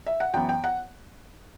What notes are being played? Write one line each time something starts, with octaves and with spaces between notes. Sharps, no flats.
E5
F#5
F#2 E3 B3 G5
G5
F#5